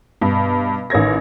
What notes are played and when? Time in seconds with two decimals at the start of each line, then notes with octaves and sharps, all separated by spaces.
0.21 G2 B2
0.90 A1 D#3 C#5 G#6 A#6